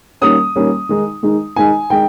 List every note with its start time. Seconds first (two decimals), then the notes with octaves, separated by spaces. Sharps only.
0.21 D#3 G3 A#3 C#4 D#6
0.56 D#3 G3 A#3 C#4
0.89 D#3 G#3 D#4
1.23 D#3 G#3 D#4
1.56 D#3 G#3 D#4 G#5
1.90 D#3 G#3 D#4 G5